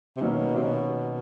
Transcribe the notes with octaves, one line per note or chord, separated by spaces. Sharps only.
C3
B2 D#3 F#3 A#3 C#4
C3
B2